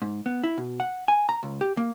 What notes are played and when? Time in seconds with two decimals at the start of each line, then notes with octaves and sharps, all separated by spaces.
0.02 G#2
0.26 B3
0.43 E4
0.58 B2
0.80 F#5
1.08 G#5
1.29 A#5
1.43 C#2
1.61 G4
1.77 A#3